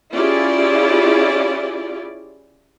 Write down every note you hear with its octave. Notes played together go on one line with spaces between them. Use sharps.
C#4 E4 F4 G4 G#4 D5